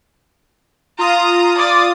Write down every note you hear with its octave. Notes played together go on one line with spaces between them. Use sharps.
F4 A#5 D#6
D5